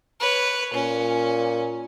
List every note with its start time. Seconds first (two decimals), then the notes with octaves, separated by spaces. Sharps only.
0.20 B4 C#5
0.74 A#2 C#4